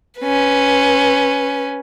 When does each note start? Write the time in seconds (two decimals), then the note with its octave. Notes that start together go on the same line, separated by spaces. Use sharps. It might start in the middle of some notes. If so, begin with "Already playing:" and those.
0.21 C#4 B4